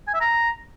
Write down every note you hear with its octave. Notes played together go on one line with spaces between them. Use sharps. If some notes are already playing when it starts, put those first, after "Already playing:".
G#5
E5
A#5